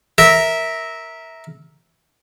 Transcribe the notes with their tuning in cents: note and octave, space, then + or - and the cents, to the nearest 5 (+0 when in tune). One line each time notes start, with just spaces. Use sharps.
A#4 +0 E5 -15